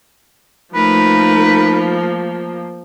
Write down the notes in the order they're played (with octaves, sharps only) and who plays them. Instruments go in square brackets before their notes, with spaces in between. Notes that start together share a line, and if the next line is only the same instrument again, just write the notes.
[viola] F3 A#3 [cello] A3 A#4 [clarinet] D#4 [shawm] B4